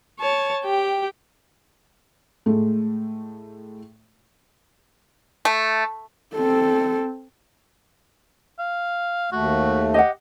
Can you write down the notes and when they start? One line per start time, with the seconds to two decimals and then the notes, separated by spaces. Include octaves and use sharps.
0.20 C#5 A5
0.65 G4 G5
2.46 A2 G#3 A3
5.45 A3
6.35 C4 A4
8.59 F5
9.32 D#2 A3 F#4
9.94 G4 D#5 F#5